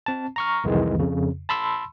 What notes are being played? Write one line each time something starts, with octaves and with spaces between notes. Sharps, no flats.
C4 A5
A#5 C#6 F6
C2 F2 D#3 E3 G#3
F2 C#3
A5 B5 C6 E6